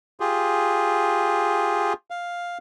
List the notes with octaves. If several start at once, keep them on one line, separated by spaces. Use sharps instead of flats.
F4 G4 G#4
F5